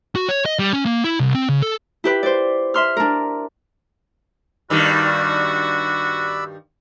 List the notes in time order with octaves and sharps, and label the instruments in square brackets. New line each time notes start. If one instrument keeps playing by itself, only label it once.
[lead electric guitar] F#4
C#5
D#5
G3
C#4
A#3
E4
C2
C4
C#3
A4
[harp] E4 G4 B4
C5 D5
E5 C6 F6
D4 A#4
[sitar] G2 D#3 G3 [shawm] F#4 [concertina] D5 B5 E6